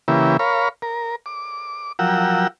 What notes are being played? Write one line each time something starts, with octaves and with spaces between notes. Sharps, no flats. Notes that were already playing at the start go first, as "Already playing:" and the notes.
C#3 E3 A#3 E4 G4 B4
A#4 C#5 F5 B5
A#4
D6
F3 F#3 A#4 F#5 G5 E6